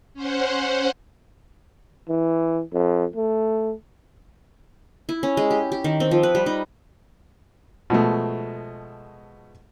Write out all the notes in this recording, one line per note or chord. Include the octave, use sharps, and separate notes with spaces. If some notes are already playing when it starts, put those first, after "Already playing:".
C#4 C5 F#5
E3
F2
A3
E4
C#4
G#3
G4
G4
D#3
C4
F3
B4
G3
D#4
B2 F3 G#3 A3